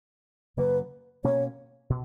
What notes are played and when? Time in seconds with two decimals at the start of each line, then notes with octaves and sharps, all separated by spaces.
0.57 F#2 C#3 F#3 A#3 B4
1.24 B2 A#3 C#4 C#5
1.90 B2